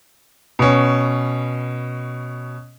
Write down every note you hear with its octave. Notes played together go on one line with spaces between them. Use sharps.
B2 C#4